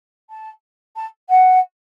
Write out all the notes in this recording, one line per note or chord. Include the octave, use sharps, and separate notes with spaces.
A5
A5
F#5